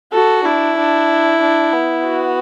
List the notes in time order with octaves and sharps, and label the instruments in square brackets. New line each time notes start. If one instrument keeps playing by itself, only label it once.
[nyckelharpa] F#4 [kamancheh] A4
[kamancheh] D4 [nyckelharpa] E4
[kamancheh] D4
D4
B3
[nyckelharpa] F#4